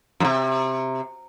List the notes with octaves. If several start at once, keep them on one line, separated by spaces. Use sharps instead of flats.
F#2 C3